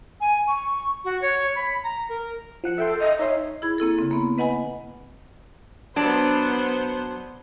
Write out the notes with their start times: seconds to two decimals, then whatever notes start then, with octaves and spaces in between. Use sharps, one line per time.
0.21 G#5
0.48 C#6
1.05 F#4
1.22 C#5
1.56 B5
1.84 A#5
2.09 A#4
2.64 F3 F#5 C#7
2.78 A4 E5 G5 C6
3.00 D#5
3.19 D#4 C#5 E5 C6
3.62 E4 G#4 B5 G#6
3.78 A#3 C4 E4 A4
3.98 C#3 C4
4.11 A#3 B3
4.38 B4 D#5 F#5 G#5 B5
5.96 F#3 B3 D4 C5